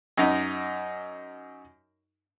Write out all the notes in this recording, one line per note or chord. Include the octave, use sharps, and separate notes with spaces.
F#2 D#4